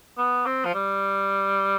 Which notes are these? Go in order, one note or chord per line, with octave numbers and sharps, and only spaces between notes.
B3
C4
F3
G3